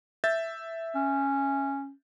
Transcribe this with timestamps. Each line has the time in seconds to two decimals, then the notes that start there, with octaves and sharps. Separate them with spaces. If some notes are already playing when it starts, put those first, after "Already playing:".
0.24 E5 G6 A6
0.95 C#4